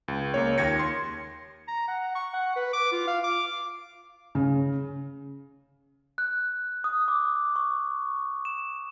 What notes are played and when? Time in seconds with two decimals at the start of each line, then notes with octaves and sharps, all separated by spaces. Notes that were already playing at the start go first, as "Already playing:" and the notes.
0.08 C#2
0.34 C#2 A#3 C#5
0.58 D#2 G#6 A#6 C#7
0.79 C6
1.68 A#5
1.88 F#5
2.15 C#6
2.34 F#5
2.56 B4
2.73 D6
2.92 F4
3.08 F5
3.24 D6
4.35 C#3
6.18 F#6
6.84 D#6
7.08 D6
7.56 C#6
8.45 E7